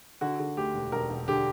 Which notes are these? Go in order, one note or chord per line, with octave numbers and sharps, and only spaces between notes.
D3 F#4
D3
D2 G4
E1
E1 A#4
E1
D3 G4